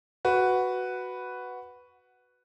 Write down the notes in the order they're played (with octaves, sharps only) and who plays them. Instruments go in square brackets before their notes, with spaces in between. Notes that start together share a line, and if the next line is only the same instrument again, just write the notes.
[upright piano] F#4 B4